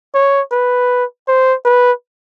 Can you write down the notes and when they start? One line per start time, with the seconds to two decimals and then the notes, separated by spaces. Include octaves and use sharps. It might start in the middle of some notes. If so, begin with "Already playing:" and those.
0.15 C#5
0.52 B4
1.28 C5
1.65 B4